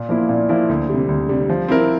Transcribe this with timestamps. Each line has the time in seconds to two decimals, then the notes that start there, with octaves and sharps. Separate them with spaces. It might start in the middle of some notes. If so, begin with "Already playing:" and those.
Already playing: A#2
0.09 F3 A#3 E4
0.29 A#2
0.49 F3 A#3 E4
0.69 D2
0.89 G3
0.94 C3
1.09 D2
1.29 C3 G3
1.49 F3
1.68 C4 E4 A#4